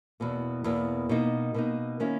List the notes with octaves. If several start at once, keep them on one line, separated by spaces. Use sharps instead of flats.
E2 B2 A#3
E2 B2 A#3
B2 A#3 D#4
B2 A#3 D#4
D#3 A#3 C#4 E4